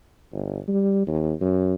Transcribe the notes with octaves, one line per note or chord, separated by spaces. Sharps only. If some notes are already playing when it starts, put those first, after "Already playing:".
G1
G3
D#2
F#2